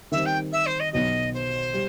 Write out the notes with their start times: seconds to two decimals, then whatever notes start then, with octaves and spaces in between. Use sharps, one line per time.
0.12 D#3 G3 C4 E5
0.25 G5
0.52 E5
0.66 C5
0.79 D#5
0.93 B1 B2 F#3 D#5
1.33 C5
1.74 G3